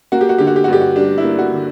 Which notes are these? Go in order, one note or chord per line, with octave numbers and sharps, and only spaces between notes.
A#3 F#4
G4
F#4
D3 G4
F#4
G4
F#4
G2 G4
F#4
G3 D4
E4
A#3
F#4
D3